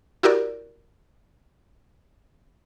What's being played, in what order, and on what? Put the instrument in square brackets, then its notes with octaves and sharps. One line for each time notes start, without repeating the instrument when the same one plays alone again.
[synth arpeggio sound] E4 F#4 G4 A#4 D5